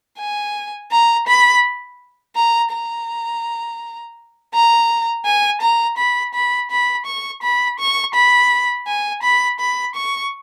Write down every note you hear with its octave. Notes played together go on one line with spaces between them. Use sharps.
G#5
A#5
B5
A#5
A#5
A#5
G#5
A#5
B5
B5
B5
C#6
B5
C#6
B5
G#5
B5
B5
C#6